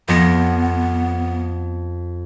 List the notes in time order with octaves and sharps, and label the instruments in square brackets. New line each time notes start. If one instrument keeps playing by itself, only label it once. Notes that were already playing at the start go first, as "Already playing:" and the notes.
[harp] F2 C6 A#6 [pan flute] B3